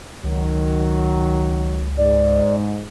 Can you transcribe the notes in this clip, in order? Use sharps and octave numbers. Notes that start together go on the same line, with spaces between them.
C#2 D#3 F#3
G#2 D5